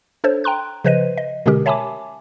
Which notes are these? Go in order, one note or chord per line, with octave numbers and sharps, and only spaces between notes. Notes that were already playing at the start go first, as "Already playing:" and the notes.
D4 A4 C5 C#5
G5 A#5 C6 F#6
C#3 F3 B4 C5 D#5 D#7
D#5
B2 D3 G#3 C#4 G4 A#4
C#5 E5 G#5 A5 B5 D6